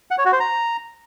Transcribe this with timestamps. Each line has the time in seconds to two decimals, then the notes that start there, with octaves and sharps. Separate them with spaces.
0.11 F#5
0.18 C#5
0.25 F#4
0.33 C5
0.40 A#5